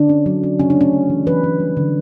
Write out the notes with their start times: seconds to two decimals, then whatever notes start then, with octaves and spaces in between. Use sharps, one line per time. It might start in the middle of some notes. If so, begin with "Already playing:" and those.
Already playing: D3 D4
0.09 C#4
0.26 F#3
0.43 C#4
0.59 C#3 C#4
0.70 D4
0.76 A3 C#4
0.93 A3
1.10 E3
1.26 E3 B4
1.44 C#4
1.60 G3
1.77 D3